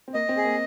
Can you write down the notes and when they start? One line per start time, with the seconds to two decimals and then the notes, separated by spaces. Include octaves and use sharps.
0.08 C4
0.14 A#3 D#5
0.29 C4
0.37 G#4
0.45 A#3